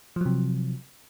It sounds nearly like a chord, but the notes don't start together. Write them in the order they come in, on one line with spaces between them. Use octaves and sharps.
F3 F#3 C3